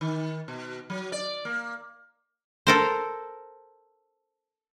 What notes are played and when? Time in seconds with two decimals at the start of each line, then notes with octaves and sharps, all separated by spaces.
0.01 D#3
0.48 B2
0.90 F#3
1.12 D5
1.45 A#3
2.67 A4 A#4 C5